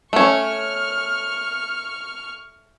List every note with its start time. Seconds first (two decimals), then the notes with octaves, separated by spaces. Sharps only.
0.13 A3 C#4 C#6 F6